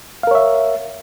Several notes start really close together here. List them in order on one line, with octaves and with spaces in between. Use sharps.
F5 A#4 C#5 E5